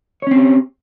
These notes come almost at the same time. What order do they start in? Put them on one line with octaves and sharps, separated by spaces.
C#5 C#4 C4 G4